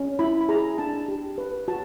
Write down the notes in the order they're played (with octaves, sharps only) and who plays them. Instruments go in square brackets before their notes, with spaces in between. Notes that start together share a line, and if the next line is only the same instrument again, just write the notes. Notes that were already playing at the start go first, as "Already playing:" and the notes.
Already playing: [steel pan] C#4
E4 B5
B5
G#4 A#5
D4 A5
G4
B4
F#4 A5